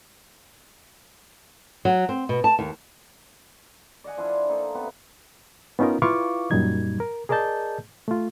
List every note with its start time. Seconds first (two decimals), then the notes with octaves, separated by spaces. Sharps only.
1.85 F#3
2.09 C4
2.29 B2
2.44 A5
2.59 D#2
4.04 D5 D#5 F#5 G#5
4.18 F3 D4 E4 F4
4.49 A#3 D#4 A4
4.75 C3 B3
5.79 B3 C#4 D#4 F4 A#4
6.02 E4 F4 B4 F5 C#6 D6
6.51 F#2 A#2 F#3 G3 D#4 G#6
7.00 A#4
7.29 G#4 A#4 D5 D#5 A5 G6
8.08 A3 F4